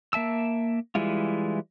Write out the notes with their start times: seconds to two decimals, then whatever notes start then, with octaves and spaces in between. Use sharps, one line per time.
0.13 A#3 E5 A5 E6
0.95 E3 G3 G#3 E4 F4